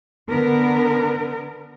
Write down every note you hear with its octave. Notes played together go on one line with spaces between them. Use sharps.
D3 B3 A#4